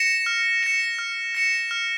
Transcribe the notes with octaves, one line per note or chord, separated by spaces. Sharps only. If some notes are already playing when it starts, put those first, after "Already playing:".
Already playing: A#6 C#7 E7
F6
A#6 C#7 E7
F6
A#6 C#7 E7
F6